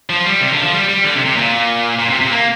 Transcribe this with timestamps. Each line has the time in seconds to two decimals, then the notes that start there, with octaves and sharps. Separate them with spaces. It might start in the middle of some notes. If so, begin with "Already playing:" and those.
0.10 F3
0.26 G3
0.41 C3
0.52 D3
0.62 F3
0.73 G3
0.89 G3
1.04 D3
1.15 C3
1.26 C3
1.36 A#2
1.99 A#2
2.10 C3
2.21 C3
2.31 A#3